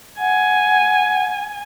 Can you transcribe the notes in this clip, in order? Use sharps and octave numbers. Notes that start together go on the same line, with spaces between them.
F#5 G#5